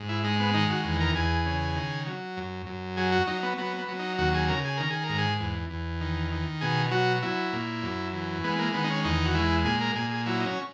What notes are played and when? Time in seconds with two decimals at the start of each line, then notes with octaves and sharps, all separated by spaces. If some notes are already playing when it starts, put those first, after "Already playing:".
Already playing: G#2
0.09 E4
0.24 G#3 D#4
0.40 B3
0.54 D#3 D#4
0.70 F#4
0.84 E2
1.00 A#4
1.15 E2 G#4
1.46 C#3
1.76 D#3
2.07 F#3
2.37 F#2
2.66 F#2
2.97 F#3 G#4
3.12 F#4
3.27 F#3 D#4
3.43 B3
3.58 F#3 B3
3.79 B3
3.88 F#3
3.99 D#4
4.18 D#2 F#4
4.34 G#4
4.49 C#3 A#4
4.65 G#4
4.77 D#3 A#4
4.91 G#4
5.04 A#4
5.09 G#2
5.18 G#4
5.40 E2
5.70 E2
6.01 D#3
6.32 D#3
6.61 B2 G#4
6.92 F#3 F#4
7.23 F#3 E4
7.53 A#2
7.83 F#2
8.13 E3
8.44 G#3 B3
8.59 A#3
8.74 D#3 B3
8.84 D#4
8.90 C#4
9.04 E2 D#4
9.25 F#4
9.34 G#3 E4
9.65 A#2 G#4
9.81 A#4
9.95 A#2 G#4
10.11 G#4
10.26 F#3 E4
10.40 D#4
10.46 C#4